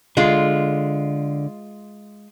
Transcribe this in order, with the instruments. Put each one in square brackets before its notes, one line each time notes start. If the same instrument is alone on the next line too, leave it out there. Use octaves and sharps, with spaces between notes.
[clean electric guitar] D3 [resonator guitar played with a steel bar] G#3 F4